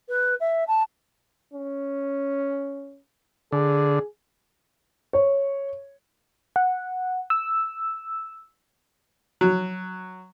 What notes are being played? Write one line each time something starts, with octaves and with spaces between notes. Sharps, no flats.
B4
E5
A5
C#4
D3 G#4
C#5
F#5
E6
F#3